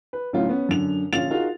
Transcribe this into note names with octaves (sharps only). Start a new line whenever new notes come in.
B4
D2 A2 F#3 C#4 F4
B3 C#4
F#2 D3 F7
A#1 D3 C#4 F4 A6 F7
D#4 F4 F#4 G#4 A#4